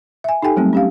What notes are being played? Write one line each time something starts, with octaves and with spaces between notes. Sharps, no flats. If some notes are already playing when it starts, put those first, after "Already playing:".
E5 G#5
D#4 G4 A4 G5 G#5
F#3 G3 A3 C4
C#4 G4 F5